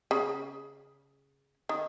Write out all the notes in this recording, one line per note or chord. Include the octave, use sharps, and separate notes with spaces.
C#3
D#3